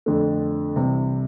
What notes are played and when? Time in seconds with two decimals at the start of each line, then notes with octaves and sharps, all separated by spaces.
0.06 F2 D3 A3
0.76 C2 C3 E3